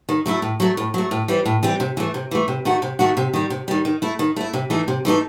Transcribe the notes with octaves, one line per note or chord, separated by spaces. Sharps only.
D#3
F#3 A3 E4 A4
A2
F#3 A3
A2
F#3 A3
A2
E3 G3 C4
A2
E3 G3 C4
C3
E3 A3
C3
E3 A3
C3
D#3 A3 D#4 F#4
C3
D#3 A3 D#4 F#4
C3
D#3 G3
C3
D#3 G3
D#3
A3 E4
D#3
A3 E4
C3
E3 A3 D#4 A4
C3
E3 A3 D#4 A4